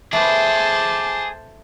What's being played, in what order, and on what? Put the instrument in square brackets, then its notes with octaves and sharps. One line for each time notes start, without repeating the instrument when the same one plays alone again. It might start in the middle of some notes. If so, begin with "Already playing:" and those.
[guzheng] A3 B4 [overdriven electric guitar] G#4 D5 [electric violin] C5 A5